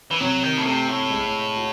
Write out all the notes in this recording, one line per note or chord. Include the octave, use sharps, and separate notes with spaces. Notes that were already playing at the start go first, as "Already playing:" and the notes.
E3
C3 F#3
D#3
A2
C3 A3
A2
G#3
F#4